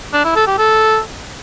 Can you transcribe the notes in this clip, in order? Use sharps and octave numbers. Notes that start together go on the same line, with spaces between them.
D4
E4
A4
G4
A4